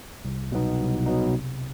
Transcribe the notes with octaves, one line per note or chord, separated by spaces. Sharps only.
C2
B2 F#3 B3 D#4
C2
B2 F#3 B3 D#4
C3